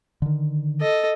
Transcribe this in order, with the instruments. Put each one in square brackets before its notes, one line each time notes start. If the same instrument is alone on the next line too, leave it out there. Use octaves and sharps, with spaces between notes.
[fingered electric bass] D3 D#3
[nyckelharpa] A4 D#5